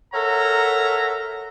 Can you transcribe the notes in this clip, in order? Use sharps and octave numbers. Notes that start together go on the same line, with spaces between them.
A4 A#4 C#5 E5 F#5 A#5